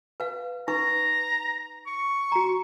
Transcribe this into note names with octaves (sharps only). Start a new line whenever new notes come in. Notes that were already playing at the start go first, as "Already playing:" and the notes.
B4 F5
D#4 B4 A#5 C#6
C#6
F#4 A#5